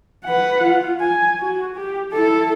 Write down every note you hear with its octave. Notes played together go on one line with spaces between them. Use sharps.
B4 F#5
F4
G#5
F#4
G4
E4 A4